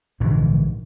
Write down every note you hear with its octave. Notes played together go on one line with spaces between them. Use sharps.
A#1 G#2 D3 E3